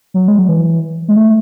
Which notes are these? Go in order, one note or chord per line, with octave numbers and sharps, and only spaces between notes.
F#3
G#3
F#3
E3
G#3
A3